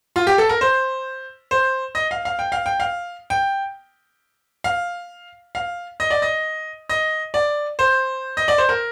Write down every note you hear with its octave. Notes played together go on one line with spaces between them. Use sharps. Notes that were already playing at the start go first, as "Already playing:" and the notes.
F4
G4
A4
A#4
C5
C5
D#5
F5
F5
G5
F5
G5
F5
G5
F5
F5
D#5
D5
D#5
D#5
D5
C5
D#5
D5
C5
A#4